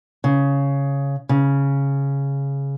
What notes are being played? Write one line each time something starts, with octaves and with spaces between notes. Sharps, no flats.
C#3
C#3